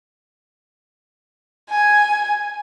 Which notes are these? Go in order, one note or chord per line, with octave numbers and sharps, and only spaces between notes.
G#5